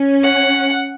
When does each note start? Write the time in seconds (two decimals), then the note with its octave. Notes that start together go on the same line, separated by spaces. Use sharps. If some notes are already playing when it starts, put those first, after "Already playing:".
Already playing: C#4
0.23 F#5